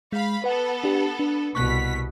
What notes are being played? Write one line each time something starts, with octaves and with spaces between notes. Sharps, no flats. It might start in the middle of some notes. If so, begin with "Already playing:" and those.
G#3 F5 B5
B3 A4 B4 F#5
D4 G4
D4
C2 B2 C#6 F#6 B6